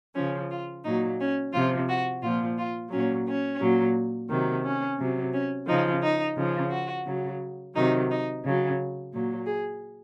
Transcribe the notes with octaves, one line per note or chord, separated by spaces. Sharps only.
C#3 F3 C#4
F4
A#2 F#3 D#4
C#4
C3 F3 F4
F#4
A#2 F3 F4
F4
A#2 F#3 C#4
C#4
A#2 F#3
C3 D#3 F#3
C#4
C3 F#3
C#4
C#3 F3 D#4
D#4
C#3 F3
F#4
C#3 F#3
C3 D#3 F#3 D#4
D#4
C#3 F#3
A#2 F#3
G#4